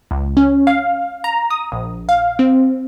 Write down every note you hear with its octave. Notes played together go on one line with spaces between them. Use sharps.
C#2
C#4
F5
A#5
D#6
A#1
F5
C4